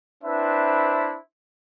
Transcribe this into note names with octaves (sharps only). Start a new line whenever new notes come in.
C4 D4 E4 B4 C5 E5